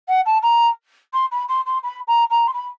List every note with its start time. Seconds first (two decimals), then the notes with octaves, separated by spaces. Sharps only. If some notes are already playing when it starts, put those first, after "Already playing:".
0.08 F#5
0.25 A5
0.42 A#5
1.13 C6
1.31 B5
1.48 C6
1.66 C6
1.83 B5
2.07 A#5
2.30 A#5
2.47 C6
2.53 B5